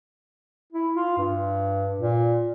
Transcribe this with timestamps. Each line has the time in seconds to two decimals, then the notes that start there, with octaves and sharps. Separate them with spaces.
0.72 E4
0.96 F4
1.18 G2
1.98 A#2